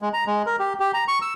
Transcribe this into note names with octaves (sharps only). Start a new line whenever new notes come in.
G#3
A#5
G#3
A#4
G4
G4
A#5
C#6
E6